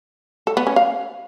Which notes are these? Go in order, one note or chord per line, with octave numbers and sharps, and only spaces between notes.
A4
B3
C#4
F5